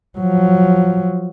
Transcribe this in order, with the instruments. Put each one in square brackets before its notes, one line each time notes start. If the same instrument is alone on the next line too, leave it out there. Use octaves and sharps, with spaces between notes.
[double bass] F3 F#3